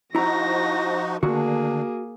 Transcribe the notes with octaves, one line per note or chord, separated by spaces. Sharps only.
F3 D#4 E4 F#4 A#5 A#6
D3 D#3 A3 A#3 D4 F#4 G#4